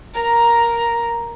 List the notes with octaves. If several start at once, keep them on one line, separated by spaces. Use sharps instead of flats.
A#4 A#5